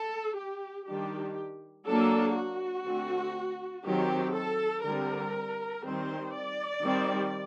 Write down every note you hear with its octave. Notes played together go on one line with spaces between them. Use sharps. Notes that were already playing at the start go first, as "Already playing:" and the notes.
Already playing: A4
G4
D#3 G3 D4 G4
F#3 A#3 D4 A4
F#4
D3 A3 C4
D#3 F#3 C4 G4
A4
D3 G3 C4 A#4
D#3 G3 C4 C5
D5
D#3 G3 C4